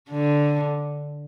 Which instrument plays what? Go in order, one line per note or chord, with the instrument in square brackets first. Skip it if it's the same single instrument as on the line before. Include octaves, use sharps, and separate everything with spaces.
[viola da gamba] D3